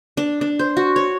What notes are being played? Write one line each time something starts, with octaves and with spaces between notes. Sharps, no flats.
D4
D4
C5
F#4
C#5